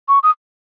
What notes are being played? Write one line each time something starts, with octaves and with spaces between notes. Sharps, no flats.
C#6
D#6